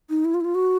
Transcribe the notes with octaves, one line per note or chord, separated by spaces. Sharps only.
D#4
E4
F4
E4
F4
F#4